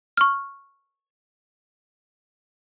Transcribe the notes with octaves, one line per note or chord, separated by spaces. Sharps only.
C#6 F6